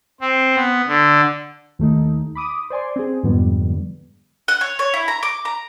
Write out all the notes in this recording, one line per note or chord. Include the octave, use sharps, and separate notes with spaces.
C4
B3
D3
D#2 A3 D#4
B5 D6 D#6
C5 D5 G#5 C6
C4 G#4
F2 G#2 D3 G3 B3
F#5
C#5
C#5
E4
A#5
D6
A#5